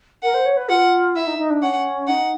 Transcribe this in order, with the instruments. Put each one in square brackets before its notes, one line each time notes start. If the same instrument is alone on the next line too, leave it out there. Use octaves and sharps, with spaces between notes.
[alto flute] A#4 [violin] F#5
[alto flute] C5
C#5
B4
[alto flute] F4 [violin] F#5
[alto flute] E4 [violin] E5
[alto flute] D#4
D#4
D4
[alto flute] C#4 [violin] F#5
[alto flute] D#4 [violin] F#5